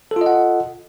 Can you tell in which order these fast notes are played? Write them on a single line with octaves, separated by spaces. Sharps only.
A4 F4 D#5 F#5